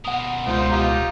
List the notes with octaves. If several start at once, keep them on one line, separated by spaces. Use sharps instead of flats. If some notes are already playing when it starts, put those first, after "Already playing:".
B2 A#4 F#5 D#6
C#2 G#3 D#4 F4 C5
D#4 F4 G4